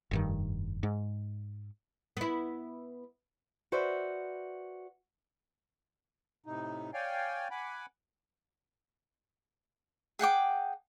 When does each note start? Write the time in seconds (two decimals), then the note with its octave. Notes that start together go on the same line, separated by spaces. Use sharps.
0.11 F1 G2 D#3
0.83 G#2
2.17 B3 E4
3.72 F#4 B4 C5 D5 E5
6.46 A2 C3 D#4
6.94 C#5 D5 F5 G5 G#5
7.51 F#5 G#5 B5 D6
10.19 G#4 F#5 G5 D6